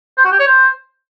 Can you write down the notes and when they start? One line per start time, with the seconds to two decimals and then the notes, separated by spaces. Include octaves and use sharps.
0.18 C5
0.25 F#4
0.32 G4
0.40 C#5
0.47 C5